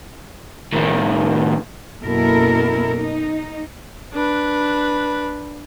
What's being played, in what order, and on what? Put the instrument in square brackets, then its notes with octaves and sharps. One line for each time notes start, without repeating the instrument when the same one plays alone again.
[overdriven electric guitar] A2 D#3
[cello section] F#2 B2 A#3 E4 A4 A#4
D#4
[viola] D4 B4